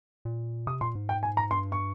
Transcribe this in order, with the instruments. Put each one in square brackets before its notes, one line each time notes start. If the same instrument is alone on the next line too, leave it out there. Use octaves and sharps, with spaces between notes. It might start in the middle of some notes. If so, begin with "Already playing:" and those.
[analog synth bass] A#2
[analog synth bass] C3 [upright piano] D#6
[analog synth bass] A#2 [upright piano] C6
[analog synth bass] G#2
[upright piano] G5
G#5
A#5
[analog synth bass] G2 [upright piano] C6
[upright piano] C#6